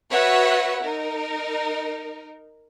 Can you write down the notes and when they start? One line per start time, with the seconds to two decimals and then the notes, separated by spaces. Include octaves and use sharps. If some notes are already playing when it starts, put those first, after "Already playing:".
0.11 F#4 B4 C#5 E5 F#5
0.84 D#4 A#4